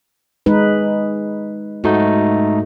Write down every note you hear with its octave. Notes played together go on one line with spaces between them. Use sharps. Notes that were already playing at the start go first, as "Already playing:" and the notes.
G#3 D#4 B4
G#2 A3 D#4 F#4